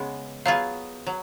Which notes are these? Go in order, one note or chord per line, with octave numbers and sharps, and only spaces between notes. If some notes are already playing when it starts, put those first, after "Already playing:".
Already playing: C#3 G#3 B3
F#3 B3 F4 G#4 F5
F#3